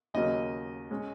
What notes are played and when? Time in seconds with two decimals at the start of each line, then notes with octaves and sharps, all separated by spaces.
0.14 D#2 C#3 F#3 A#3 D#5
0.91 G#3 C#4